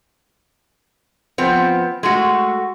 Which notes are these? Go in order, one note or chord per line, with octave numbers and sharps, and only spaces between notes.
F3 B3 C4
G#3 A3 F#4